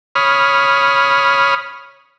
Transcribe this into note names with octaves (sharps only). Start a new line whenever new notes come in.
C#5 B5 D#6 F6